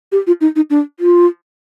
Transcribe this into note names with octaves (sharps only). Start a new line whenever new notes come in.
G4
F4
D#4
D#4
D4
F4